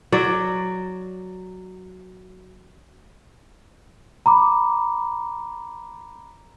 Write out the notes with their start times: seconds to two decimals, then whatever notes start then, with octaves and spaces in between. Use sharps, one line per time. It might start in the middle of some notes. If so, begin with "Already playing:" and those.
0.12 F#3 D5
4.26 A#5 B5 D6